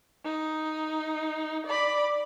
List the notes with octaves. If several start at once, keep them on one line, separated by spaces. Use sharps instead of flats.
D#4
D5 B5